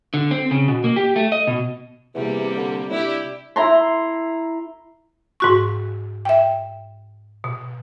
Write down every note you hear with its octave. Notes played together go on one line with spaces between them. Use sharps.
D3
C4
C#3
B2
A#3
G4
A3
D#5
B2
E2 C3 G3 A#3
D3
D4 E4 G4
E4 A#5 C6
G#2 F#4 C#6
E5 G5
B2